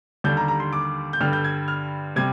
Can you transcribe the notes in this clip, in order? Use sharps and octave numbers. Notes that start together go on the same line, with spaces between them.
D#2 D3 G3 D4 G6
A#5
A#5
C6
D6
G6
G2 D3 G3 F6
G6
G#6
F6
C3 G3 G#6